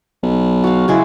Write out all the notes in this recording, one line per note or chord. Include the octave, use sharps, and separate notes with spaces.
B1
F#4 F5
C#3 F#3 G#3 E4